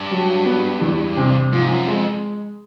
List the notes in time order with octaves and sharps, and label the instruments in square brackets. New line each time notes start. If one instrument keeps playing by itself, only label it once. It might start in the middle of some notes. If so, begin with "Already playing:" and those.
Already playing: [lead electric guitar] G2
[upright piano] F#3
B3
E2
C3
[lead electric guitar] G#2 [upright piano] F3
[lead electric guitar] F#2
[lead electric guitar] F2 [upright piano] G#3